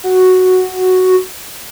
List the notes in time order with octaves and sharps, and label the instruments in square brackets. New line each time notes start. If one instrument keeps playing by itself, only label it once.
[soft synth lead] F#4